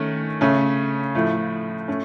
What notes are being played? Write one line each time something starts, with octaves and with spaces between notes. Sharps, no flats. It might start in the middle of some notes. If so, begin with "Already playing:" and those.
Already playing: D#3 A3 C#4
C#3 A3 C#4
A2 F3 A3
A3 C#4